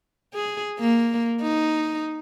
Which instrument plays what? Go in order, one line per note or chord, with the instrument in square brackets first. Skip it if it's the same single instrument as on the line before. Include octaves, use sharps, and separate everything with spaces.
[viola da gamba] G#4
A#3
D#4